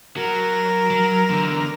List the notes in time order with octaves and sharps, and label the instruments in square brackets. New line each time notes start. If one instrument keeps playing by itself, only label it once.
[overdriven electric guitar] F#3 [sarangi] A#4
[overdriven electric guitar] F#3
E2 D3